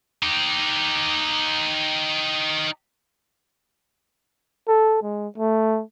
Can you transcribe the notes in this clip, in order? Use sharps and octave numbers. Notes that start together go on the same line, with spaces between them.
D#4 G4
A4
G#3
A3